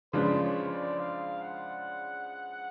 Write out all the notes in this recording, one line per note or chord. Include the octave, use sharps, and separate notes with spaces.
C#3 F3 G#3 D4 B4
C#5
D5
F5
F#5